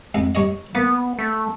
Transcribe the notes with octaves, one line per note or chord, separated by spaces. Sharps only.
F2 G#2
G2 C#5 D#5
A#3 B3
A3